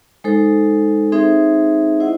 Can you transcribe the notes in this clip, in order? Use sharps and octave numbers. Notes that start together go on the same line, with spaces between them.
G#3 D#4 A4 C5
C4 D#4 G#4 C5 E5
E4 C5 D#5 F#5